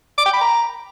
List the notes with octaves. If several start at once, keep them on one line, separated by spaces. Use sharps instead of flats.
D6
G5
B5
A#5